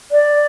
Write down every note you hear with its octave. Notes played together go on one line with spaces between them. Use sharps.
D5